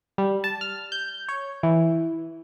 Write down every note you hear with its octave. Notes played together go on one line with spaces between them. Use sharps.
G3
A5
F6
G6
C#5
E3